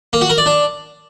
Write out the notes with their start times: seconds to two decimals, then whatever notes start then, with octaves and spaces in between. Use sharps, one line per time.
0.13 A#3
0.21 F#4
0.30 A#4
0.38 D5
0.46 D4